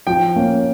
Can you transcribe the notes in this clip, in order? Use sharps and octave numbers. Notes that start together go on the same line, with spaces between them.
F3 G5
A#3 C#4